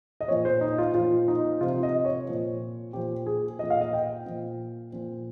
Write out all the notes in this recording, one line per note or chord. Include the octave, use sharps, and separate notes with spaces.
D#5
A#2 F3 C#5
C5
D#4
F4
A#2 F3 F4
D#4
C3 F3 F4
D#5
C#5
A#2 F3
A#2 F3 G4
G#4
A#2 F3 D#5
F5
D#5
G5
A#2 F3
A#2 F3